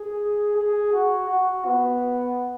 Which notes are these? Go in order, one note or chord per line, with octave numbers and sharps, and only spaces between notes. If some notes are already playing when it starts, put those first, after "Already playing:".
Already playing: G#4
G#4
F#4
F#4
B3